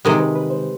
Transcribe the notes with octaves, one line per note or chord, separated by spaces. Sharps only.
C3 D#3 G#3 G4
B4
B4
C5